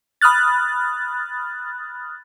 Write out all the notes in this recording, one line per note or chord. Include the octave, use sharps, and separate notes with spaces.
B5 D#6 F6 F#6 A6